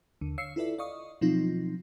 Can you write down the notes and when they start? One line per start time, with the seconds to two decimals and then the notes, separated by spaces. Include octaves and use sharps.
0.21 D#2 D3
0.38 C#5 F5 E6 C7 C#7
0.56 E4 F4 A4 B4 D5 E5
0.78 D5 D#5 F5 C#6 D#6
1.21 B2 F3 F#3 C4 D#4 F4